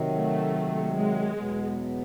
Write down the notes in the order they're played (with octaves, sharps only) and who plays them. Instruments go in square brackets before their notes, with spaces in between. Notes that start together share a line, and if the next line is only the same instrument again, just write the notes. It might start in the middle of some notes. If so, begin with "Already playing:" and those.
Already playing: [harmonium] C3 D#3 F#3
[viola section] A3
G#3
[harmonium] E2 B2 F#3 B3